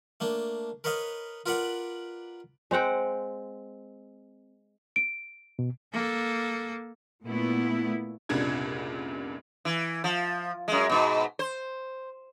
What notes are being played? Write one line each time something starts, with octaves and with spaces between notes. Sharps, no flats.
A3 A#3 D4
A#4 B4 C#5 D#5 F5
F4 A#4 B4 D5 F#5
G#3 C4 F#5 G5
D7
B2
A#3 A4
A#2 A3 B3 E4
F1 C2 A#2 C#3 D4 G#6
E3
F3
F#2 G#3
G#2 B2
C5